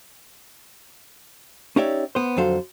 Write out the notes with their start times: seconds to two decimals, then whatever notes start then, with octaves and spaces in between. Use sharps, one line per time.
1.76 C#4 D#4 G4 C#5 D5 E5
2.15 B3 C5
2.37 F2 D3 F#3 A4 C5 F5